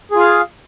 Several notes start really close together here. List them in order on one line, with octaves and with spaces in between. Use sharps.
G#4 F4 F5